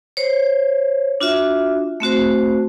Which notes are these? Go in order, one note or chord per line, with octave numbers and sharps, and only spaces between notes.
C5 C#5
D4 F4 F#4 E5
A3 C4 F#4 C5